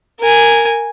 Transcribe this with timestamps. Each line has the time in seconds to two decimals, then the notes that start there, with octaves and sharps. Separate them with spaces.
0.20 A#4 G#5